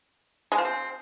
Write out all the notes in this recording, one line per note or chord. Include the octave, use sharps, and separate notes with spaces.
G#3
F3
C4